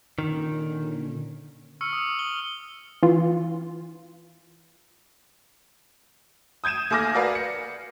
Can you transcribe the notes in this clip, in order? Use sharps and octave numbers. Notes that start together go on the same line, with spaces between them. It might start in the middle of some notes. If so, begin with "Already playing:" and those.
A#2 D3 D#3 C#4
C#6 E6 F6 C#7
D#6
G7
E3 F4
D#6 G6 G#6 D#7 E7
D#2 A3 G#5 D6 F6 A#6
F#4 A#4 B4 D5 F5
C#7